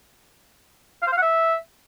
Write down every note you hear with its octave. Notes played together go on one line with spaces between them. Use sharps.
F5
C5
F5
F#5
E5